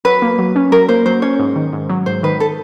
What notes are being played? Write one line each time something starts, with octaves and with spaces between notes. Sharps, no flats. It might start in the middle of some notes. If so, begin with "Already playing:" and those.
F#3 B4
A#3
F#3
C#4
F#3 A#4
A#3 C5
F#3 C5
C#4 C#5
G#2
D#3
G#2
F#3
G#2 C5
D#3 B4
A4